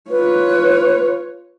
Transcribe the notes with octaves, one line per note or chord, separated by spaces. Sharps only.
F4 B4 C#5